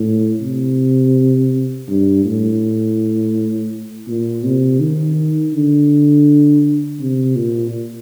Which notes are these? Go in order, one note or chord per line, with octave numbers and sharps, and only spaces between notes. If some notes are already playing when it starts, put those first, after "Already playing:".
Already playing: A2
C3
G2
A2
A#2
C3
D#3
D3
C3
A#2